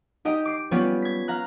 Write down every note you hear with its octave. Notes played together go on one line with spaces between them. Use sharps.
D#4 G4 D#5 G5
D6 C7 D7
G3 B3 C#4 F4 G4
G#6 B6
F5 A#5 F#6